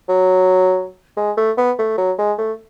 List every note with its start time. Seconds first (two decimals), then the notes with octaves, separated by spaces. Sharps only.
0.09 F#3
1.17 G#3
1.37 A3
1.57 B3
1.79 A3
1.98 F#3
2.18 G#3
2.38 A3